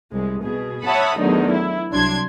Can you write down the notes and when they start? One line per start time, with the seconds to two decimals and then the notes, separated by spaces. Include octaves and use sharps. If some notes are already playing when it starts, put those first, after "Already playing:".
0.12 C2 G#3
0.43 B2 G#4
0.83 C#5 E5 F#5 A5 B5 D#6
1.18 E2 D3 D#3 F#3 A3 D#4
1.52 E4
1.91 C2 F#3 D4 C6 G#6